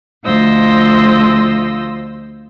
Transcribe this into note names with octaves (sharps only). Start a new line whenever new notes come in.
D2 F3 F4 C5 D#5 E6